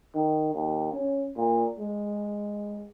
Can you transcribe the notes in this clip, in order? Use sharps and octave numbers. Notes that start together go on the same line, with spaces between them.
D#3
D#2
C#4
A#2
G#3